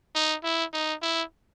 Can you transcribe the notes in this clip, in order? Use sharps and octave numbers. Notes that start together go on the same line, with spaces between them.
D#4
E4
D#4
E4